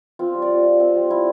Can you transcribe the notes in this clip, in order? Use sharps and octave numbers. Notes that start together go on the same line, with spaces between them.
C4 F4
G3
D5
G3
F4
C4
G3
E4